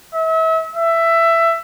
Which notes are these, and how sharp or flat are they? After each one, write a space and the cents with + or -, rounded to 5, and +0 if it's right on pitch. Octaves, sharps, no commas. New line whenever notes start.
E5 -35
E5 +15